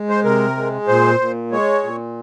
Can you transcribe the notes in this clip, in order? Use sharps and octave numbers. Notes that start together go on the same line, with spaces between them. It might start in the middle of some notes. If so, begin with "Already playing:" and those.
Already playing: G#3
C5
C3 A#4
G#3
A#2 C5
A#2
G#3 C#5
A#2